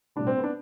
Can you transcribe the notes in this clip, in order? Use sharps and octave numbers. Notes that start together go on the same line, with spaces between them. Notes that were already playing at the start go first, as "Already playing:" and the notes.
B1 A2 G3 D4
C4
B3
D4